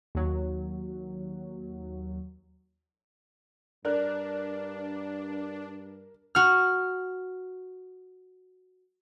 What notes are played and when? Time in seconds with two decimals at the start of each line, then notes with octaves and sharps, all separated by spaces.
0.15 D#2 F#3
3.85 G2 D4 A#4 D5 F#6
6.35 F#4 F6